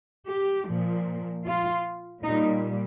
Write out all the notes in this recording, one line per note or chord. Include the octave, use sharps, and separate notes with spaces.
G4
A#2 F3
F4
A#2 G3 D#4